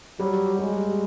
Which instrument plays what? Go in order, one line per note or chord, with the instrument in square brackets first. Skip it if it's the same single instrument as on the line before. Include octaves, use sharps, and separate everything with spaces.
[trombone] F#3 [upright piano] G3
[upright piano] G3 [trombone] G#3